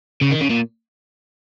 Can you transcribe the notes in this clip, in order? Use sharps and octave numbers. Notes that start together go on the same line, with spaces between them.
C#3
D#3
C#3
A#2